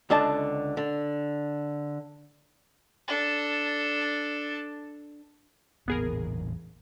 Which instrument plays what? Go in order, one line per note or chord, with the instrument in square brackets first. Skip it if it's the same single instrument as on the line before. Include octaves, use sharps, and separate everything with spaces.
[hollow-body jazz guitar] C#2 D3 D4 D#5 A5
D3
[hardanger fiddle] D4 A4
[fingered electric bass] A1 E2 A#2 [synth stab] B3 G#4 A#4